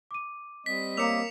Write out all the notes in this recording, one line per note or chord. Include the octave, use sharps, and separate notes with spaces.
D6 D#7
G3 C4 D#5 B6
A#3 C#5 D6 E6 C#7 E7 F7